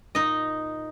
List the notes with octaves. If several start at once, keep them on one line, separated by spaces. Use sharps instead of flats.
A#2 D#4 D#5